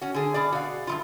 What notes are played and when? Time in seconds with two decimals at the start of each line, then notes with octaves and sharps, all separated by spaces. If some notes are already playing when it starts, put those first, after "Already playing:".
0.01 C#4 F#4
0.14 D3 G#4
0.34 B2 G#4 D5
0.52 F#4 F5
0.87 G2 E3 F4